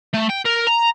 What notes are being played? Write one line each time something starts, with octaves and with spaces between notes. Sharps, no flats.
A3
G5
A#4
A#5